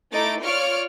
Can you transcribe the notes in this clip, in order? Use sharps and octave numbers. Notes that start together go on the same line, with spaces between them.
A3 D#4 E4 D6 A6
F4 C#5 D5 C#6 F6 D7